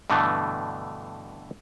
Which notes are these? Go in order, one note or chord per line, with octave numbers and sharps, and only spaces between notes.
G2 B2 D3 E3 A3